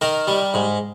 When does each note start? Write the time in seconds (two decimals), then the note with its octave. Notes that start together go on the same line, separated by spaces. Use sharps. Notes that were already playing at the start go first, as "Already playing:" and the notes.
0.01 D#3 A#4
0.27 G3
0.54 G#2